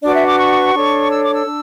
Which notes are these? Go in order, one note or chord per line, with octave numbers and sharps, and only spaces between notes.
D4 F#4 B4 D5
E5
D6
C#6
D4 A4 C#5
E6
D6
E6
D4